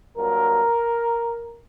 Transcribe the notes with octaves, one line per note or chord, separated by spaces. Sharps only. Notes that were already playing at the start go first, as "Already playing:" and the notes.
G2 F#3 A#3 A#4